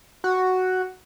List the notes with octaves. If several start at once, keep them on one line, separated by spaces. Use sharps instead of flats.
F#4